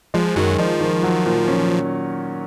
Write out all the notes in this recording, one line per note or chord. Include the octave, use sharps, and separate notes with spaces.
F3 G#3
F#2 D#3 F#3
F3 D#4
D#3
F#3
A#2
C#4